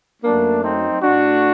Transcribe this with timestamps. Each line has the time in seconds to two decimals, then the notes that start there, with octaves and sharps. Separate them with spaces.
0.23 F#2 F#3 A3 A#3 D4
0.62 C4 D#4
1.02 A2 A3 D4 F#4